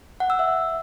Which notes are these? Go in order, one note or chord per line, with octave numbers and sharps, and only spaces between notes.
F#5
E6
E5